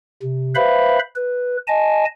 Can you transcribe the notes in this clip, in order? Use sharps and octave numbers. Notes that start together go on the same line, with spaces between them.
C3
B4 C5 E5 F5 B5
B4
D#5 G#5 A5